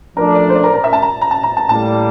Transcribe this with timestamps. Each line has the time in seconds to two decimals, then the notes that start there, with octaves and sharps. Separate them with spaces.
0.16 F3 A3 D4 A#4
0.35 D5
0.49 C5
0.55 D5
0.64 A#4
0.74 A#4
0.84 E5
0.93 A5
1.02 A#5
1.21 A#5
1.31 A5
1.43 A#5
1.57 A5
1.69 A2 G3 A#3 A5